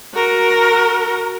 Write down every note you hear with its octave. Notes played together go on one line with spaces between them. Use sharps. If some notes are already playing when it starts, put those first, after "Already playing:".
F#4 A#4